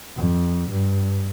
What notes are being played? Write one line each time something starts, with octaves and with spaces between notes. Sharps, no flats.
F2
G2